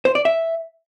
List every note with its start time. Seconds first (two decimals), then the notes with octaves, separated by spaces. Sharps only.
0.05 C5
0.15 D5
0.25 E5